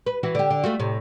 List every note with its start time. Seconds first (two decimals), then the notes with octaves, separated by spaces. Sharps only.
0.06 B4
0.23 E3 E4 F#4
0.35 D3 G4
0.50 D3
0.64 A3 F4 F#4
0.80 A2 C3